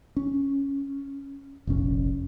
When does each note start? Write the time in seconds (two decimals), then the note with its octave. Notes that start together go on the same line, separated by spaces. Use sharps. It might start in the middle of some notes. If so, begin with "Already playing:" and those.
0.16 C#4
1.67 F1 A#1 C#4